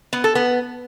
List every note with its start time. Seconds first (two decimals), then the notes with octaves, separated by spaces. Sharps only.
0.13 B3
0.24 A4
0.35 B3